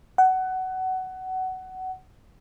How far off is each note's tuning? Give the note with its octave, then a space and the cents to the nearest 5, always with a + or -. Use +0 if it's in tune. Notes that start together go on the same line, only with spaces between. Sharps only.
F#5 +20